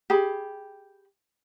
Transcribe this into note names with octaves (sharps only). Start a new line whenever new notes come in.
G4 G#4 B5